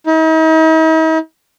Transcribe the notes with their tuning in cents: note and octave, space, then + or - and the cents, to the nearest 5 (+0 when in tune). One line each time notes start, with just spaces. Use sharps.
D#4 +45